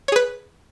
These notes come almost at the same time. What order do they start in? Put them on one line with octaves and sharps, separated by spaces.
C#5 G#4 B4